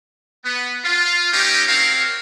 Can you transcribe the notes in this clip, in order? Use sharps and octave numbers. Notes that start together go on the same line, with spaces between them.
B3
F4
A3 C#4 D#4 G4
C4 F#4 A#4 C#5 F5